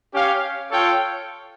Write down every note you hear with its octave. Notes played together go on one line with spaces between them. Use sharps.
C#4 G4 C#5 F5
F4 A4 C#5 G5